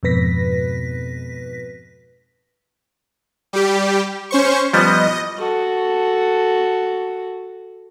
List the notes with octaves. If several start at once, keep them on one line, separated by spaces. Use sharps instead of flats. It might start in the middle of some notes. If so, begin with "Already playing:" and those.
F2 G#2 B2 B4 A#6 B6
G3 G4
C#4 C5 C#6
F3 G3 B3 D#5
F#4 A4